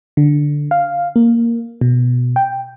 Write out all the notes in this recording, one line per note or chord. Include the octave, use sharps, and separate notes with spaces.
D3
F5
A#3
B2
G5